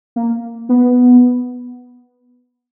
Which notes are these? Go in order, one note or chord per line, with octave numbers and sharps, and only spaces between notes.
A#3
B3